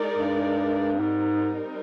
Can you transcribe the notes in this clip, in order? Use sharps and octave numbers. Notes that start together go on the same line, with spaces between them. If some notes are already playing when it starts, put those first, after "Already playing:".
Already playing: G#3 D#4 A#4 D5
G2
G#2 G3 C4 D#4 A#4